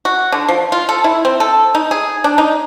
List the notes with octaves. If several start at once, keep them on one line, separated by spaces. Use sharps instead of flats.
F#4
D3
F3
F4
A4
E4
C4
A4
D#4
G#4
D4
D#4